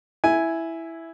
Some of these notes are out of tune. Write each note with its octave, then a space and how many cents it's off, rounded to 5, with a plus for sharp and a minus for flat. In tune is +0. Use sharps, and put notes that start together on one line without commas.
E4 +0 G#5 +0